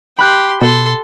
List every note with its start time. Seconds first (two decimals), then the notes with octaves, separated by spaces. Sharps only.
0.19 G4 B5 C6 F#6 G6
0.61 B2 A4 C6